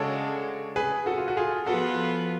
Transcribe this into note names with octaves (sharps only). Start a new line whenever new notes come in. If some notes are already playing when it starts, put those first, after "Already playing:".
Already playing: C#3 G#3 D4 F#4 A4 C#5
G#4 B4
F#4 A4
F4
F#4
F4 G#4
F3 B3 F4 F#4 A4 B4